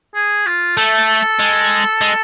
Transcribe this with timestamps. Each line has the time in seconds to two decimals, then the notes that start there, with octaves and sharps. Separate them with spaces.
0.15 G#4
0.46 F4
0.77 A3 A4
1.39 G#3
2.01 G#3